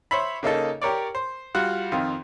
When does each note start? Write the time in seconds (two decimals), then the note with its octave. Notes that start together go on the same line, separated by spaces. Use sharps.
0.11 C5 C#5 E5 B5
0.43 C#3 A#3 D#4 A4
0.82 G4 A#4 C#5 D5
1.15 C5
1.55 G3 F4 F#4 F#5
1.92 F2 D#3 F4